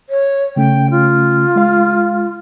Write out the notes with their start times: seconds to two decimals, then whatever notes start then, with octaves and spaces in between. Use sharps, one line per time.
0.10 C#5
0.56 C#3 A3 C#4 G5
0.91 F4
1.56 G#3 F5